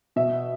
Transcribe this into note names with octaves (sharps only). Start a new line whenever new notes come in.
B2 E5